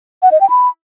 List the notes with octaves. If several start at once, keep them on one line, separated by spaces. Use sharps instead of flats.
F#5
D#5
G5
B5